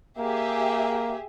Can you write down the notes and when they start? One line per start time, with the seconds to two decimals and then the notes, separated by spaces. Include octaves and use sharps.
0.18 A#3 G4 G#4 E5